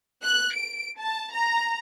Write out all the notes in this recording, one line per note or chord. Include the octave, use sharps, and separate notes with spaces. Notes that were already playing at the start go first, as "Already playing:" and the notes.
F#6
D7
A5
A#5